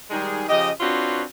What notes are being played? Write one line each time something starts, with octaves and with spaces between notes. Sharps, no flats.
D#3 G3 G#3 D#4 G#4
C#3 F3 G4 D#5
C4 D4 F4 F#4 B4 C#5